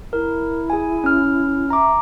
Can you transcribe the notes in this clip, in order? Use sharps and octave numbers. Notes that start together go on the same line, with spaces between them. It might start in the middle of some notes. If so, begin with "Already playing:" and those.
E4 A#4
G#4 G#5
C#4 F6
E5 A#5 D6